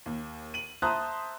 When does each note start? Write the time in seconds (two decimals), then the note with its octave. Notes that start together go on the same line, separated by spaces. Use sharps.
0.06 D#2
0.54 D#7 F#7
0.82 C5 E5 A5 A#5 D#6 F#6